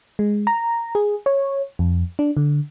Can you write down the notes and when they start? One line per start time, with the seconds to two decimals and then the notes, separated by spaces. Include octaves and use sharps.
0.19 G#3
0.47 A#5
0.95 G#4
1.26 C#5
1.79 F2
2.19 D4
2.37 D3